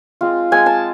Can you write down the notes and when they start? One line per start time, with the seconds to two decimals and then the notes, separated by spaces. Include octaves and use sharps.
0.21 G#3 C4 F4
0.51 G#3 C4 F4 G#5
0.66 A5